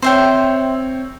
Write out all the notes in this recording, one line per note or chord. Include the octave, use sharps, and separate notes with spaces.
C4 C5 C#5 E5 G5